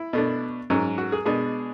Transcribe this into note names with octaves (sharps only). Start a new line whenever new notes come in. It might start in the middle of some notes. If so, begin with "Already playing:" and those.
Already playing: E4
B2 A3 D4
G#2 F#3 C#4
F#4
G#4
B2 G#3 D4 G#4